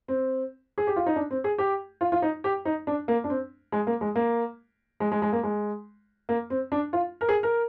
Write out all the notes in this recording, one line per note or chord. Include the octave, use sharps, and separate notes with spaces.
C4
G#4
G4
F4
D#4
D4
C4
G#4
G4
F4
F4
D#4
G4
D#4
D4
A#3
D4
C4
G#3
A#3
G#3
A#3
G#3
G#3
G#3
A#3
G#3
A#3
C4
D4
F4
A#4
G#4
A#4